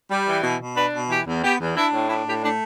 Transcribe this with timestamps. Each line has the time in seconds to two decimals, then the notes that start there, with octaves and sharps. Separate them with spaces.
0.10 G3
0.27 E3
0.43 B2
0.60 B2
0.76 D4 B4
0.93 B2
1.09 E3 G4
1.26 E2
1.43 B3 G4
1.60 E2
1.75 D4 E4
1.93 A2
2.09 D4 E4
2.26 A2 G4
2.43 A3 D4